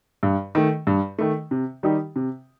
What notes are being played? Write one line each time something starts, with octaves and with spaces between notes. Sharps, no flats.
G2
D#3 A3
G2
D#3 A3
C3
D#3 G3 D#4 G4
C3